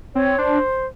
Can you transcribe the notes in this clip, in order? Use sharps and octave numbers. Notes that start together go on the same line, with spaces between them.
C4 C#5
D4 C5